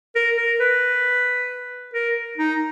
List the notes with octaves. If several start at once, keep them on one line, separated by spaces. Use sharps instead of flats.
A#4
A#4
B4
A#4
D#4